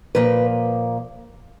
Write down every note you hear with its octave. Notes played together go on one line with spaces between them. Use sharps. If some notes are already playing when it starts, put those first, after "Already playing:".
A#2 F3 A#3 B4